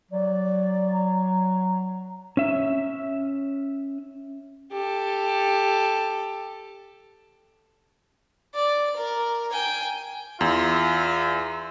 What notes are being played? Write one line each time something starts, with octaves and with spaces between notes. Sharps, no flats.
F#3 D5
A#5
C#4 E5
G4 A4
D5
A#4
G5 G#5
E2 F4 E5